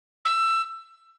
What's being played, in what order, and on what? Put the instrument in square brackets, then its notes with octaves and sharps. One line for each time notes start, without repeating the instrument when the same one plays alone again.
[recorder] E6